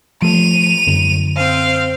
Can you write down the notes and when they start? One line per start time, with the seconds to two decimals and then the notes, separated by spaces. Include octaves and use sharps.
0.22 F3 A3 D#7 F7
0.87 F#2 D3
1.37 C4 F5